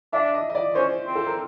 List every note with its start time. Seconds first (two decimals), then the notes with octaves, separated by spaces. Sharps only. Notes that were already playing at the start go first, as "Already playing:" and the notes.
0.13 D4 E5
0.34 D#5
0.50 D#5
0.55 D5
0.74 C#4 C5
1.06 C4
1.15 A4
1.27 A#4